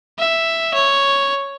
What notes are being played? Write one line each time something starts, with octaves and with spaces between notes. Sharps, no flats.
E5
C#5